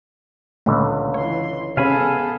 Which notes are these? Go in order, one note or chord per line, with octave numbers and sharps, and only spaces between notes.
C#2 A#2 D3 A3
E3 C#5 C6
C3 B3 C#4 G#4 A4 F5 G#5 B5